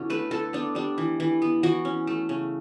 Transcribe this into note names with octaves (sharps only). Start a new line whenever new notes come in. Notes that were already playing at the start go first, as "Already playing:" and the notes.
Already playing: D3 B3 C#4 E4 F#4
A3 B4
D3 A4
B3 D4
G3 D4
E3
E3
B3
E3 F#4
C#4
A3
C#3